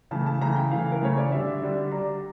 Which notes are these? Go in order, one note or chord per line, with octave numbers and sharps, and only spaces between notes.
C#3 E3 A3 A5
A5
C#3 E3 A3 A#5
G5
C#3 E3 A3 F5
A#4
C#3 E3 A3 C#5
D5
D3 G3 D4 E5
D3 G3 D4
D3 G3 D4 A#5